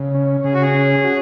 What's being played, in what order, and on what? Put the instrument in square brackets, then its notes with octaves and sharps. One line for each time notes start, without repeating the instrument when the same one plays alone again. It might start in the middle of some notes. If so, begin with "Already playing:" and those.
Already playing: [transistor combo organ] C#3
C#4
[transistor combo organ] C#3 [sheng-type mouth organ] G#4
[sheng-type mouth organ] F#4
G#4
[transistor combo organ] C#4
F#4